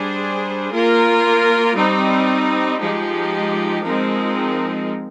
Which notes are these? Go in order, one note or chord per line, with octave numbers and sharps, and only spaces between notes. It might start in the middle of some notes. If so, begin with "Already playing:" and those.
Already playing: G3 D4 G#4 C5
A#3 F4 A#4
G3 C4 D#4
F3 G#3 D#4 G4
F3 G#3 C4 D#4 A#4